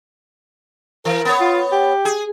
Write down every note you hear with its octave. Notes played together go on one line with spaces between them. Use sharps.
E3 A#4
B3 C#5
F4
G4
G#4